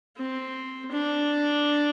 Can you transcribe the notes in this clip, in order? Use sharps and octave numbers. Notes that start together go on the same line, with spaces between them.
C4
D4